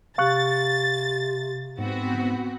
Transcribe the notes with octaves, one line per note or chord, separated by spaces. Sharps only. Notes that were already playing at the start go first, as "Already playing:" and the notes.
C3 F5 C#6 F#6 A6
G#2 B3 C4 F#4